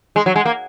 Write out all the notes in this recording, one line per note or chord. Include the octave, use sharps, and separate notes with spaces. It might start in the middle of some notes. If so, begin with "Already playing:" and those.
G#3
F#3
G#3
A#3